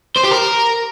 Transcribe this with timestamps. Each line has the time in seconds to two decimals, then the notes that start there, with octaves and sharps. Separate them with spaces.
0.17 C5
0.25 G4
0.32 A#4